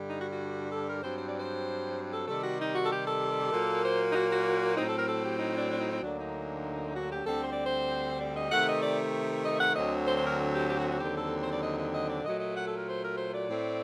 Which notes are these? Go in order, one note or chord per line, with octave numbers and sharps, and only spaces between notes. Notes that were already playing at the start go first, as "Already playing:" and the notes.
Already playing: G2 D3 G3
D#4
F#4
F#4
A4
A#4
G2 F#3 C4 C5
C5
D5
C5
A4
C3 D#3 G3 A4
F#4
D#4
F#4
A4
G4
A4
A#2 F#3 A#3
C5
D#4
F#4
F#4
A2 F#3 C4 D#4
A4
A#4
A4
G4
D#4
D4
D4
D#4
D#4
D2 D3 F#3 A#3 D4
D#4
F#4
G4
D2 D3 G3 C4 A4
C5
D5
C5
D5
D#5
C3 D#3 A3 F#5
D#5
D5
D#5
F#5
D2 D3 F#3 C4 D#5
C5
C5
A#4
G4
G4
F#4
F#4
D#2 D3 F#3 C4 G4
A4
C5
D5
D#5
D#5
D#5
D5
A#2 F#3 A3 D#5
D#5
F#5
A4
A#4
C5
A#4
C5
D5
A2 A3 C4